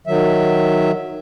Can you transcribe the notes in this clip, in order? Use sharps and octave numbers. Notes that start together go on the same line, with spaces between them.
D#3 F#3 E5